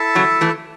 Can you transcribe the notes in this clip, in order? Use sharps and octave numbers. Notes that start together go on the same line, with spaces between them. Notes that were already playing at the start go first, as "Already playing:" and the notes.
Already playing: E4 A4 E5 A5
C#3 F#3
E3 A3